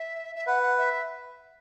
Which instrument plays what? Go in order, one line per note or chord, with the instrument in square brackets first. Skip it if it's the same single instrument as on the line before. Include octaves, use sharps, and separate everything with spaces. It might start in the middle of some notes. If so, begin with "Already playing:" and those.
Already playing: [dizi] E5
E5
[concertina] B4 [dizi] F#5
[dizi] F#5
E5